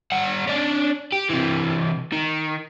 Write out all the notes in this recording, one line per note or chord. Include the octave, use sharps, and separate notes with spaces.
G3 F#5
C#4 D4
G4
C3 E3
D#3